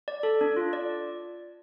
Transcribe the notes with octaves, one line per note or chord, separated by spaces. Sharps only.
D5
A4
D4
F4
D5